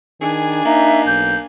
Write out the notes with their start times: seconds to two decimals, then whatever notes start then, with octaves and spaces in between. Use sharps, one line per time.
0.21 D#3 D4 G#4 G#5
0.65 A#3 D#4 E5
1.07 B1 G6